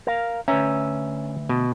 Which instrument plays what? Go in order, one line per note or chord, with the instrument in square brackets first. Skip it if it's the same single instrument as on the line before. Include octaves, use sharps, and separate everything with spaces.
[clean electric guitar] A#4 F5
[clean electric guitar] D2 B4 E5 [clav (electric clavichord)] C#4 A#5
[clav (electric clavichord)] B2